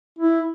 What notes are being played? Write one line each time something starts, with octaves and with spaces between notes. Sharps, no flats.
E4